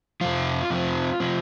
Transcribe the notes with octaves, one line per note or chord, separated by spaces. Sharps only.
F2 C3 F3 C4 F4
F2 C3 F3 C4
C3 F3 C4